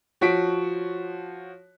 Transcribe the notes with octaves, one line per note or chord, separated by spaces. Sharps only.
F3 F#4 C#5 B6 D7